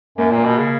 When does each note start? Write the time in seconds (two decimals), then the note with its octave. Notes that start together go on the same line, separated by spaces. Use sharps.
0.18 F#2 A#3
0.31 A#2
0.38 A#3
0.45 B2
0.58 C#3